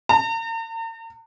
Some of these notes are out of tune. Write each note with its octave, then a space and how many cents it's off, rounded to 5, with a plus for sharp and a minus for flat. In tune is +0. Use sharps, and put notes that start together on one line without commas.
A#5 -45